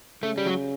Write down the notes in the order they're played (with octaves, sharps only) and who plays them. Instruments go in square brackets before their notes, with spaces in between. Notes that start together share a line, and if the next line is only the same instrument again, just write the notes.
[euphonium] C#3 [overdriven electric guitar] A3
[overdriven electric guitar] G3
F#3